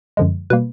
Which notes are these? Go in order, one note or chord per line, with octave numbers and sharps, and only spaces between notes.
F#2 D3 F3 G#3
B2 G3 A#3 B4